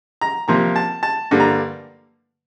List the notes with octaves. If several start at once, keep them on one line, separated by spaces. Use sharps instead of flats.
A#5
C3 F3 A#3 A#5
A5
A5
G2 D3 G3 A#3
A#5